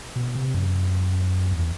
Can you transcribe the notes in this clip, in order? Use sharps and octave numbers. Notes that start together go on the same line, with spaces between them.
B2
C3
F#2
E2